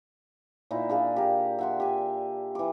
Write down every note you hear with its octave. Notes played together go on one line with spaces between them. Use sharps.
A#2 D#4 E4
D4 G#4 F5
G4 A#4
E5 F#5 C6
G4 G#5
E3 D6